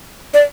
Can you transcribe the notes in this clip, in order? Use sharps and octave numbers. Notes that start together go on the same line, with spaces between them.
D5